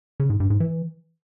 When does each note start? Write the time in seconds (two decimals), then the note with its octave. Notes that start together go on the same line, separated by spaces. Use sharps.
0.20 C#3
0.30 G#2
0.40 G2
0.50 G#2
0.60 E3